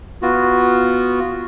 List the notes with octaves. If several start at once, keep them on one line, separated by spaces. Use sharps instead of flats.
B3 F4 F#4